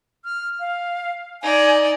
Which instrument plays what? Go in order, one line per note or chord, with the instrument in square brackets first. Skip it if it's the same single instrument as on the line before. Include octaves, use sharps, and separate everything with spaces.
[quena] F6
F5
[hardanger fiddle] D#4 D5 [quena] G#5